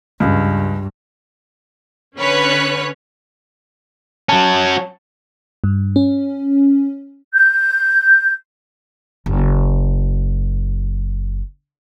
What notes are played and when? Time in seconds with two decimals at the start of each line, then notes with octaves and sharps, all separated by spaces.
0.20 C#2 G2
2.18 D3 C#4 B4 C#5 F#6
4.29 F#3 C#4 A5
5.64 G2
5.96 C#4
7.34 G6
9.26 F#1 F#2